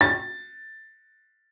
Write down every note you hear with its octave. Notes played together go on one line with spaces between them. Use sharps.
A6